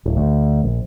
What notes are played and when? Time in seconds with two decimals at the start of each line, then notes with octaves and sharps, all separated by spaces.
0.06 D1
0.17 D2
0.64 A#1